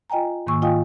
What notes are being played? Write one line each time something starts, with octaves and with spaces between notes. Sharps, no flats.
F4 D#5 G5 G#5 A#5
G#2 D#3 A#3 G#5 C#6 E6
F4 D#5 F5 G5 G#5 D#6